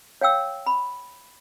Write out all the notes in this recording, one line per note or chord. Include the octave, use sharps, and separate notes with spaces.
C#5 F5 G5 E6
B5